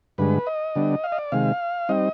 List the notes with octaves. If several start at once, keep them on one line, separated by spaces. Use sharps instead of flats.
G2 D3 G#3 B4
D#5
D3 G3 B3 D4
F5
D#5
D5
C3 D#3 G#3 F5
G3 C4 D#4 D#5